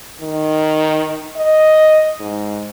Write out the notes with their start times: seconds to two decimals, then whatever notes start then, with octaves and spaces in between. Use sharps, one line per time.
0.21 D#3
1.36 D#5
2.20 G#2